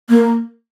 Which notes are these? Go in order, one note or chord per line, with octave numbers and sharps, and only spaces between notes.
A#3